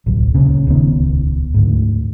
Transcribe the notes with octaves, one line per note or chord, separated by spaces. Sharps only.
D1 B1
C#2 A#2 C#3
D#1 C#2 D#3 B3
D2 G#2